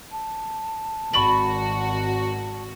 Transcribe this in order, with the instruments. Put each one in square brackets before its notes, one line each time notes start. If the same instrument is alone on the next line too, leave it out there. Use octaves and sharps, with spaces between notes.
[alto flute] A5
[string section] G#1 F#4 [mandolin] D5 B5 C#6